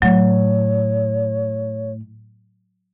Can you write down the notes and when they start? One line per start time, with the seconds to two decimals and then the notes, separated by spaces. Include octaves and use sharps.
0.02 A2 F#3 C#5